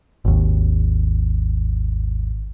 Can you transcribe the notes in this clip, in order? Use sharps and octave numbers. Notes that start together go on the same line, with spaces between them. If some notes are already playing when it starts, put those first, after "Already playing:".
G#1 D#2